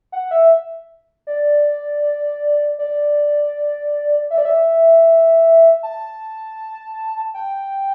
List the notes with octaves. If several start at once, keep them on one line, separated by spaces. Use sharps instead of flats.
F#5
E5
D5
D5
E5
D5
E5
A5
G5